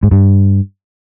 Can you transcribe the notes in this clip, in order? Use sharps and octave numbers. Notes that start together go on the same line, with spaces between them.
G#2
G2